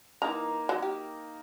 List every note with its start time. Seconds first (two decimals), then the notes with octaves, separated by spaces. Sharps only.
0.22 E3 A#3 D#4 A#4 A#5
0.69 F#3
0.82 G4